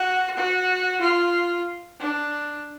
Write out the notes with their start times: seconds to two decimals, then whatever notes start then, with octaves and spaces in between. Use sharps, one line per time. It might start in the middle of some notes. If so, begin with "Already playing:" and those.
Already playing: F#4
0.36 F#4
1.01 F4
2.00 D4